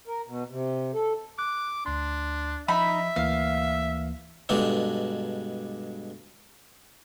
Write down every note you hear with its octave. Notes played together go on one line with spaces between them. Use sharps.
A#4
B2
C3
A4
D6 F#6
D2 D4 C6
F3 D#4 D#5 E5 B5
D2 E3 A#3 F5
G2 B2 G#3 D4 A4